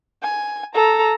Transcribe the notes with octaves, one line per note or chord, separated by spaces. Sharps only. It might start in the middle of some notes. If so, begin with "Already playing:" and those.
G#5
A4 A#5